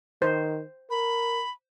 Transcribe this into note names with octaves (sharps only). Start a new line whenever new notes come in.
D#3 C5
A#4 B5